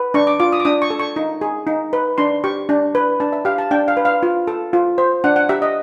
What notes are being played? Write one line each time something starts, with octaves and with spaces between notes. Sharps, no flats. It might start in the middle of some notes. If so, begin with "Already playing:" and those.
Already playing: B4
D4 C#6
D6
F4 D6
D#6
D6
D4 D#6
C#6
A4
C#6
D#4
G#4
D#4
B4
D4 C6
G4 C#6
D4
B4
D4 A5
E5
G4 F5
A5
D4 G5
F5
B4
F5
F4
A4
F4
C5
D4 F#5
F#5
G4 E5
D#5